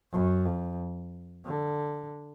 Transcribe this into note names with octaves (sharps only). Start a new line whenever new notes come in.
F#2
F2
D3